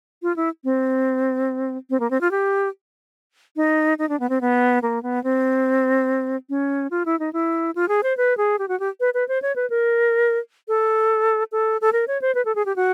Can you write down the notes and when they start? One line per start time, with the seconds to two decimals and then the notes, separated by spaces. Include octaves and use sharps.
0.23 F4
0.36 E4
0.64 C4
1.90 C4
2.00 A#3
2.11 C4
2.21 F4
2.31 G4
3.56 D#4
3.99 D#4
4.09 D4
4.20 B3
4.29 C4
4.41 B3
4.82 A#3
5.03 B3
5.24 C4
6.50 C#4
6.91 F4
7.06 E4
7.20 D#4
7.33 E4
7.75 F4
7.88 G#4
8.03 C5
8.17 B4
8.37 G#4
8.59 G4
8.68 F#4
8.80 G4
9.00 B4
9.14 B4
9.28 C5
9.42 C#5
9.56 B4
9.70 A#4
10.68 A4
11.52 A4
11.81 A4
11.93 A#4
12.08 C#5
12.22 C5
12.35 B4
12.45 A4
12.55 G#4
12.66 G4
12.76 F#4